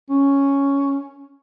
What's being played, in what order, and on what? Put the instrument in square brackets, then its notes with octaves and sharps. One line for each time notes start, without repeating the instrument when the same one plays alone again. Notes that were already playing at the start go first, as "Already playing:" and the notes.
[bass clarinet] C#4